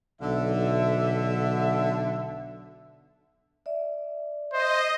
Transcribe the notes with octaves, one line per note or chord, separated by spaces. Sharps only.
B1 D3 E5
D5 E5
C5 D#5